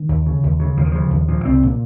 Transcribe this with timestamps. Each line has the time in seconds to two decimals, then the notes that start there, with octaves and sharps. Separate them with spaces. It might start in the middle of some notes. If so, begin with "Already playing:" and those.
Already playing: D#3
0.09 D#2
0.26 C#3
0.43 D#2
0.60 C#3
0.77 D#2 F3
0.84 D#3
0.92 C#3 F3
1.11 D#2
1.28 A#2 F3
1.45 C2 C4
1.63 A#2